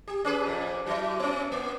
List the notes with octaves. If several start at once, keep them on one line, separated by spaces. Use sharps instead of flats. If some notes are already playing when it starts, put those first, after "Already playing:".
G4
C#4 G#4 B4
F2 A#2
F#3 E4
B3 C#4
A#3